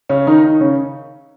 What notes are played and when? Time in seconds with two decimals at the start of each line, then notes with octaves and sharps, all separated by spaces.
0.09 C#3 C#4
0.27 D#3 D#4
0.44 D#3 D#4
0.61 C#3 C#4